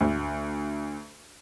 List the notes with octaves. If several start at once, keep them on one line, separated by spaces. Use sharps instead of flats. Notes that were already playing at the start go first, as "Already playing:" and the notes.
D2